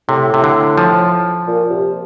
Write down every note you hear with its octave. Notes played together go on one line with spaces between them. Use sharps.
A2 C3
C3
D3
F3
A#2
C3